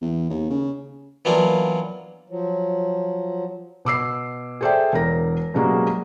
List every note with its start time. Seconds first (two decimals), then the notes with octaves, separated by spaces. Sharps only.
0.02 E2
0.30 D#2
0.50 C#3
1.25 E3 F#3 A#3 B3 D4 F4
2.30 F3 F#3
3.85 B2 D6 E6 C7
4.61 G#4 A4 C5 D5 E5 G5
4.93 E1 A#4 A#6
5.54 F#2 B2 G3 G#3 A#3 F#4